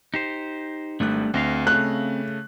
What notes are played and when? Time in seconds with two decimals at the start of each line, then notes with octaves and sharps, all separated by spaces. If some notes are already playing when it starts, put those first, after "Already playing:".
0.14 D#4 G4 C5
1.00 G#1 G3 A3 D4 F#6
1.34 D2 C4 D#5 F5
1.67 C#3 A3 F#6